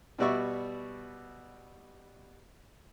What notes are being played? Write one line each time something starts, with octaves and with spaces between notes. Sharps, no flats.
B2 G3 F#4 D5 E5 C#6